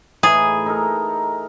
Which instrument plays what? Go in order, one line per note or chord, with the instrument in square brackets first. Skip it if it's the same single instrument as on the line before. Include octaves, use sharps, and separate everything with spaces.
[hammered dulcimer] A2 E3 D#4 [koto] G#4
[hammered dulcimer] D#4 A4 A#4